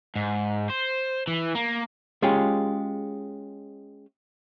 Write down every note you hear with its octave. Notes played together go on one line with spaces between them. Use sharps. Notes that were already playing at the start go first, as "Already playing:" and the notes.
G#2
C5
E3
A#3
G#3 C#4 F4 G4 G#4